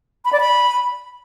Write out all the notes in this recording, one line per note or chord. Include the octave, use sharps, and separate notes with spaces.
B5
D5
B5